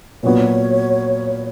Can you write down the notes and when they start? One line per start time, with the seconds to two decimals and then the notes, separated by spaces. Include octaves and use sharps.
0.23 A#2 F#3 B3 F#4 C#5